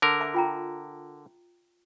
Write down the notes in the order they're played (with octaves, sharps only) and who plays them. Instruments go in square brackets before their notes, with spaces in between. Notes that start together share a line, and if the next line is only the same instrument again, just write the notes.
[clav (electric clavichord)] D3 A#4
[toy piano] E5 A5 D6
F4 G5 A#5